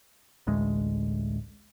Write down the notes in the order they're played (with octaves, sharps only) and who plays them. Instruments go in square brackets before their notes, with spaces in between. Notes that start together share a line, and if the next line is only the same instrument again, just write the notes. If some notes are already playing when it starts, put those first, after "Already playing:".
[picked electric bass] A1 D2 G#3